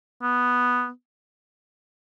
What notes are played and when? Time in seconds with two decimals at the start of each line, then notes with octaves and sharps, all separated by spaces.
0.22 B3